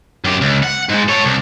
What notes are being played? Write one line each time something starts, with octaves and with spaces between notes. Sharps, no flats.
F#2 G4
C#2
F#5
G#2 G#3
A4 C#5
C2